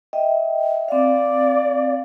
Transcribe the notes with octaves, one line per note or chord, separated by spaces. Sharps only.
D#5 E5 G5
C4 D5 F5